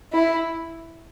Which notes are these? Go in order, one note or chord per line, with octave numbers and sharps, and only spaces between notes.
E4